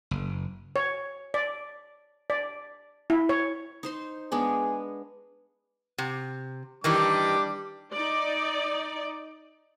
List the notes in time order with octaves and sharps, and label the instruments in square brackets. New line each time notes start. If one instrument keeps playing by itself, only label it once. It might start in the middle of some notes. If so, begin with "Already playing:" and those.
[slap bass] F#1
[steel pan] C#5
D5
D5
E4
C#5
[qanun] D#4 C5 C6
[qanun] G#3 B3 D4 [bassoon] G#4
[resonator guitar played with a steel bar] C3
[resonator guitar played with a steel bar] D#3 E3 D#4 [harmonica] G3 D4 D6
[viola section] D#4 D5